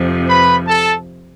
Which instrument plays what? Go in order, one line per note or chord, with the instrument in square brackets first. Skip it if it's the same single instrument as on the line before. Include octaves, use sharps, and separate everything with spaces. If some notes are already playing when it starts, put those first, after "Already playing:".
Already playing: [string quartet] F2 C3 F3
[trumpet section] B4 B5
A4 A5